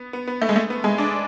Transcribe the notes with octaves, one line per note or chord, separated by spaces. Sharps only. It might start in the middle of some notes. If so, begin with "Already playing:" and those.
Already playing: B3
B3
B3
A3
G#3
A3
B3
G#3
D4